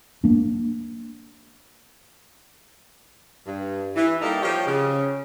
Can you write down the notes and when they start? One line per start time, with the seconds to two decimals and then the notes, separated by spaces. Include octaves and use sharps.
0.24 A#3 D4
3.47 G2
3.96 E3
4.22 G3 A#3 D#4 A4 D#5
4.42 F3 G4 C#5
4.66 C#3